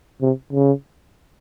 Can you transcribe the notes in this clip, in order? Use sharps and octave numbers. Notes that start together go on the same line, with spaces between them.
C3
C#3